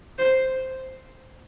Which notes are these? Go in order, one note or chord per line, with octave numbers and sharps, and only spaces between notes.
C5